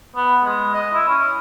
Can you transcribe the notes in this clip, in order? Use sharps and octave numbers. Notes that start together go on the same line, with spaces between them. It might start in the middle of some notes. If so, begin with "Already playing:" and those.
B3
G#3
D#5
E4
C#4